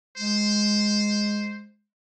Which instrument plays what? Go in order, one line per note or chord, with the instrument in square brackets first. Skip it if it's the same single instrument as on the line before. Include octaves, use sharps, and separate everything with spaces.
[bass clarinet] G#3 [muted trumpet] C5